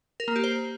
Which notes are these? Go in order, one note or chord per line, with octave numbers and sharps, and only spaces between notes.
A#4
A#3
G4
C5